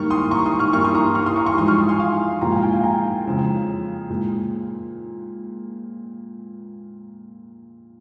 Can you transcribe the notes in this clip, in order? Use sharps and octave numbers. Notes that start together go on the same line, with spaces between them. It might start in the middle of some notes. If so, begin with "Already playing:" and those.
Already playing: G#2 D#3 G3 A#3 C#6 F6
C6 D#6
A#5 C#6
C6 D#6
C#6 F6
G2 G3 A#3 C#6 F6
C6 D#6
A#5 C#6
C#6 F6
C6 D#6
A#5 C#6
A#5 C#6
G#2 F3 G#3 C6 D#6
C#6 F6
C6 D#6
G#5 C6
F5 G#5
A#2 F3 G#3 G5 A#5
F5 G#5
G5
F5 G#5
G5 A#5
F2 C#3 G#3
A#2 G#3